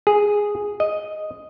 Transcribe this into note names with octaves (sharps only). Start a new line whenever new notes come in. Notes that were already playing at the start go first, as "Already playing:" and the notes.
G#4
D#5